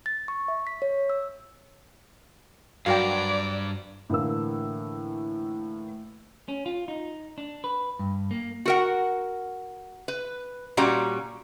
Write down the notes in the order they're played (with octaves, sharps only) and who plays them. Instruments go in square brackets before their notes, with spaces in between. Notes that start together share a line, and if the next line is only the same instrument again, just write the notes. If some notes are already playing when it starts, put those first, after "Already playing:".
[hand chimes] A6
C#6
E5
B6
C#5
E6
[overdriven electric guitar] G2 [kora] F#3 A#4 C5 [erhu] D5 [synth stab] F5 G5
[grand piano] A2 D3 E3 A#3 E6
[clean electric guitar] C#4
F4
D#4
D4
B4
G2
A#3
[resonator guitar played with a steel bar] F#4 A#4 F#5
B4
A#2 G3 C#4 F#4 D5 A#5